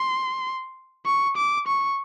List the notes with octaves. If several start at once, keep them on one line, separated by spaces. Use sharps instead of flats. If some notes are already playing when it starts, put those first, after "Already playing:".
Already playing: C6
C#6
D6
C#6